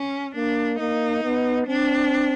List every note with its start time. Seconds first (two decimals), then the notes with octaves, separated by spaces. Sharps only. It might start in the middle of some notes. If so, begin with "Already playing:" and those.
Already playing: C#4
0.36 A#3 D4
0.79 A#3 D#4
1.23 B3
1.67 C4 D4